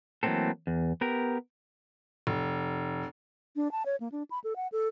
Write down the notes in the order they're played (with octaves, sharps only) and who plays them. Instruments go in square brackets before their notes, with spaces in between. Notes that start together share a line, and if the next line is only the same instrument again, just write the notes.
[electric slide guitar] E3 F#3 A3 A#3 C4 A4
E2
B3 G4 A#4
[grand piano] F1
[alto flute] D4
A5
C#5
A#3
D4
B5
A4
F#5
A4